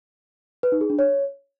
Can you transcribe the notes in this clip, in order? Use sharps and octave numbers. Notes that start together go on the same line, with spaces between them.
B4
D#4
G#4
D4
C#5